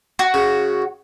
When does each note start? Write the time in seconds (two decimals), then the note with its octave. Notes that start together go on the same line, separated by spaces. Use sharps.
0.19 F#4
0.34 C#3